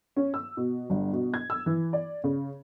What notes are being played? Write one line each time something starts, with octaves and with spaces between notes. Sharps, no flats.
C#4
E6
B2
G1
B2
G#6
E6
E3
D5
C#3